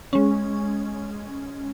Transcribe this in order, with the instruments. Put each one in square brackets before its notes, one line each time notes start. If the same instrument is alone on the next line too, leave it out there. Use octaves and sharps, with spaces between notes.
[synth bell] G#3 C#4